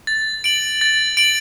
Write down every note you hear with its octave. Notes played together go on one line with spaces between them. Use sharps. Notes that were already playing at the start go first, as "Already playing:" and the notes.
A6
D7 F#7
A6
D7 F#7